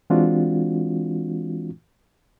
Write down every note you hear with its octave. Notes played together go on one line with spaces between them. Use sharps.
E3 G#3 C4 D4 F4 F#4